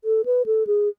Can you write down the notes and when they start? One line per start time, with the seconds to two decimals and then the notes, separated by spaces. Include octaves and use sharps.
0.04 A4
0.25 B4
0.46 A4
0.67 G#4